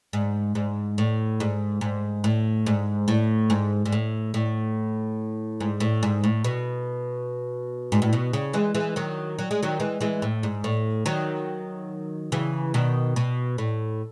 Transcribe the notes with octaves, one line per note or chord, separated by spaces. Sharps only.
G#2
G#2
A2
G#2
G#2
A2
G#2
A2
G#2
G#2
A2
A2
G#2
A2
G#2
A2
B2
G#2
A2
B2
C#3
E3 G#3
E3 G#3
D#3 F#3
F#3
G#3
D#3 F#3
E3 G#3
E3 G#3
A2
G#2
A2
D#3 F#3
C#3 E3
B2 D#3
B2
A2